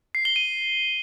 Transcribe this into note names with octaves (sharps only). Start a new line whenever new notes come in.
C7
G7
D#7